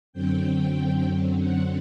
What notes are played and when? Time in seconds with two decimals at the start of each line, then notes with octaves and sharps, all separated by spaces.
0.13 F#2 D3 F#3 C4 G5
1.40 F#5